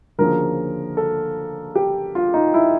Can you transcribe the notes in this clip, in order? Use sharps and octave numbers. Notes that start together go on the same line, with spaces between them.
D2 C#3 F3 A#3 C#4 A#4
A4
G4
F4
D#4
E4